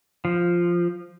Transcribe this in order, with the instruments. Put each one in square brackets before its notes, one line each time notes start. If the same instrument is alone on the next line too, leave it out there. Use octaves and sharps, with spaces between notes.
[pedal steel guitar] F3